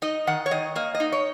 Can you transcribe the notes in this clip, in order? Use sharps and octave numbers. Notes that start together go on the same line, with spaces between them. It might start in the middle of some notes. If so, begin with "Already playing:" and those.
D#4 D#5
D#3 F#5
C#5
D#3 D#5
A#3 D#5
D#5
D#4
C#5